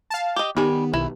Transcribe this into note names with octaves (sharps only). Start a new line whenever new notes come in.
F5 A5
G4 D#5
D#3 G3 B3 D#4 G4 G#5
B1 E4